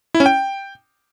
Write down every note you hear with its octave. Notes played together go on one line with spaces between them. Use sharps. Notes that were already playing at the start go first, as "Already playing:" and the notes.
E4
C#4
G5